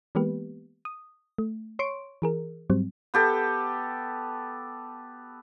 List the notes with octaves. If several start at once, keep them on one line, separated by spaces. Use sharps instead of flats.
E3 G#3 A#3 B3 G4 B4
D#6
A3
C#5 C6 C#6 D7
E3 G#4 A#4
G#2 F#3 G3 C4
B3 G4 A4